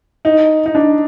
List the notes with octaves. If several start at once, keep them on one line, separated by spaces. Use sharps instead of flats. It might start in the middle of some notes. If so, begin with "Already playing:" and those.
D#4
D#4
D4